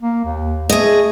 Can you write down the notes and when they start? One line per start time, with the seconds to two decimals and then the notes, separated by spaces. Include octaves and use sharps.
0.02 A#3
0.25 D#2
0.69 A3 G#4 D#5